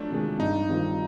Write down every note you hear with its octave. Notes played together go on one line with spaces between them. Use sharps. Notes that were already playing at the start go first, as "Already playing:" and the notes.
Already playing: F3 F#3 A3 D4
C3 D#3 G#3
G2 D#4
D#3 G3 C4 F4